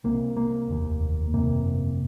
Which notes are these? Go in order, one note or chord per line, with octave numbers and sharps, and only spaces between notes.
C2 C3 A#3
A#3
F1 D#2
G1 F2 C3 A#3